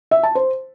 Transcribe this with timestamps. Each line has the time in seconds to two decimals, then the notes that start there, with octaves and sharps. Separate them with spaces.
0.11 E5
0.23 A5
0.35 C5